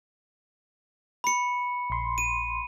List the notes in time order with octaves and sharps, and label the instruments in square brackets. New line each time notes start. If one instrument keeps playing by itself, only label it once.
[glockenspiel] B5 C#7
[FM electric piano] A#1 C6
[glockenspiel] D#7